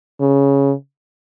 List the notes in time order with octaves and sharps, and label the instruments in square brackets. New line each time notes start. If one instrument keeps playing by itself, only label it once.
[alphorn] C#3